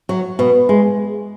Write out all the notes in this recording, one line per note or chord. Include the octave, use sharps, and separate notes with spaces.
F#3
B2
G#3